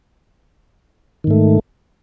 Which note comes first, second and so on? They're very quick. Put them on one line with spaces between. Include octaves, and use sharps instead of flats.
D#3 G#2 A3